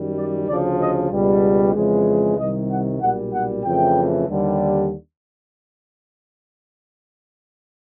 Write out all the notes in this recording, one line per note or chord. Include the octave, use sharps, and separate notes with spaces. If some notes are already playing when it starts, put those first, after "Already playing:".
Already playing: F#2 D#3 G3
D5
D2 C#3 F3 D5
D#5
C#2 B2 G3
F2 C#3 E3 G#3
C2 C3 D#3 G3 D#5
F#5
B1 A#2 G3 F#5
F#5
F2 C#3 E3 A3 G5
D#2 D3 G3